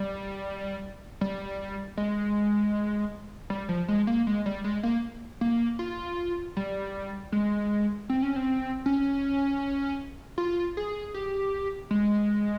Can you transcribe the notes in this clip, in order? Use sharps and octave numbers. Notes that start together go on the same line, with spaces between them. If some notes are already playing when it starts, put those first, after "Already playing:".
Already playing: G3
G3
G#3
G3
F3
G#3
A#3
G#3
G3
G#3
A#3
A#3
F4
G3
G#3
C4
C#4
C4
C#4
F4
G#4
G4
G#3